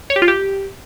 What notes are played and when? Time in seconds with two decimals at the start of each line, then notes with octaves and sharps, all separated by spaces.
0.10 C#5
0.16 G4
0.22 F4
0.28 G4